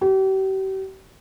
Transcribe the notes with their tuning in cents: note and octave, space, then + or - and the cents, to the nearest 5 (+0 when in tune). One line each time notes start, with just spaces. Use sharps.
G4 -40